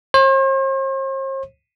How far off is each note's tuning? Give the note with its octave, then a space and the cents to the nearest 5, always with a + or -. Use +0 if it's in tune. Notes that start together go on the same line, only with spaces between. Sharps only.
C5 +45